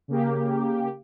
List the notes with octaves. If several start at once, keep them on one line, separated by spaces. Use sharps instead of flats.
C#3 A#3 G4